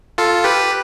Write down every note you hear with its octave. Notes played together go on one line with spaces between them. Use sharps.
F4 A4
G4 B4